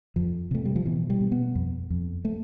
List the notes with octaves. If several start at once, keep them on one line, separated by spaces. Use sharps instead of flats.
F2 F3
C3 A3
G3
F3
B2 E3
G3
B2
B3
F2
F2
A3